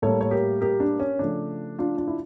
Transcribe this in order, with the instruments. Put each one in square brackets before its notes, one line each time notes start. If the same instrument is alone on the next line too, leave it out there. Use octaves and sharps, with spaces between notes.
[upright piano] A2 G3 A#3 A4 C#5
C#5
G4 A#4
G4 A#4
D4
C#4
C#3 F3 A3 D4
D4 F4
D4 F4
E4